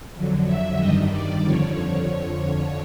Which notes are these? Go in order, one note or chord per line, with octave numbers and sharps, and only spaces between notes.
F2 D3 F#3
E5
G2 D#3 G3 D#5
D5
F2 D3 F3 C#5